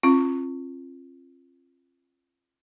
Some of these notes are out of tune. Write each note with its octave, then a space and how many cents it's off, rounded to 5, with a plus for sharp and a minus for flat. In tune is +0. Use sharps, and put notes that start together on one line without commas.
C4 +45 F4 -15